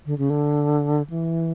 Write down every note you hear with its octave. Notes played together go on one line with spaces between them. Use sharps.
D3
C#3
D3
E3